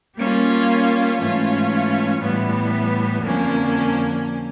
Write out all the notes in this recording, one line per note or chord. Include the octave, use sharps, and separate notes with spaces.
G3 A#3 C#4 F4
G#2 E3 A3 C#4 F4
A2 E3 G3 B3
F2 D3 F3 A#3 C#4